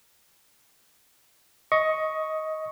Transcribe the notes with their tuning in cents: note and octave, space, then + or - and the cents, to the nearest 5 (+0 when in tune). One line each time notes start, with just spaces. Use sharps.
D#5 +15 C#6 +0